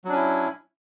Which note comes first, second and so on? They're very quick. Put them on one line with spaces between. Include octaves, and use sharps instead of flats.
F#3 D4 C#4 E4